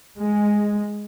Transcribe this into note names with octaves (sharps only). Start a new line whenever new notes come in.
G#3